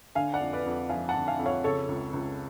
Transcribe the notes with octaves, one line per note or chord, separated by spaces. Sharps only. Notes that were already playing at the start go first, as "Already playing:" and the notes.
D3 F5 G#5
D5 F#5
F2
B4 D5
F2
F3 F5 G#5
F#5 A5
D3
F5 G#5
F2
C#5 F5
C#3 A4 C#5
C#2
C#2